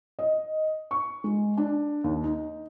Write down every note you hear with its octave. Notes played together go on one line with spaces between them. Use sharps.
D#5
C#6
G#3
D4
D#2
D#4